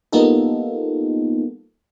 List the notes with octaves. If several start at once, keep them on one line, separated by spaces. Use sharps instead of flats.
G3 A#3 B3 D#4 F4 A4